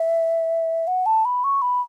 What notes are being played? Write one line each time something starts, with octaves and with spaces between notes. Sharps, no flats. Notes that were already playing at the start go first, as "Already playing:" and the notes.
Already playing: E5
F#5
A5
B5
C#6
B5